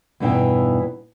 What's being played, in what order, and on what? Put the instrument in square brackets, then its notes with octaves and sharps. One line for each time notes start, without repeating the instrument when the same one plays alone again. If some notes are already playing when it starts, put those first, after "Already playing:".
[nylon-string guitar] E2 G2 B2 E3 D#4 G5